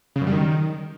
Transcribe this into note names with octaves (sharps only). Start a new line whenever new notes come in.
C#3
F#2
G3
D#3